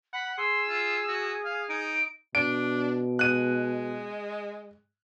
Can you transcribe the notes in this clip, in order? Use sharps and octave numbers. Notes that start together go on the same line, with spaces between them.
F#5 B5
G#4 C6 E6
F4
F#4
F5
D#4 D7
B2 D4 D7
G#3 F#6 D#7